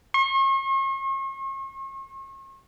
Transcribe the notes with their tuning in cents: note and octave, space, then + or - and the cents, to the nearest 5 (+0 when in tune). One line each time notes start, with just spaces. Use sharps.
C#6 -45